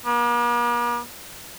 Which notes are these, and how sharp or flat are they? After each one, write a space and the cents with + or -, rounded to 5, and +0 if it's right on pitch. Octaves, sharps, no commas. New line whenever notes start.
A#3 +45